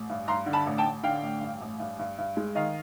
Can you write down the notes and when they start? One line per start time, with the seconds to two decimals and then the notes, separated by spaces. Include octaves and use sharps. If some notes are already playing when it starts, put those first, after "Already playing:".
Already playing: A1
0.09 G2
0.28 G2 A#5 C6
0.46 D3
0.53 A5 B5
0.66 A1
0.78 G5 A5
0.85 A1
1.03 D3 F5 G5
1.23 A1
1.41 G2
1.61 A1
1.79 G2
1.99 G2
2.18 G2
2.37 G#3
2.55 D#3 D#5 F5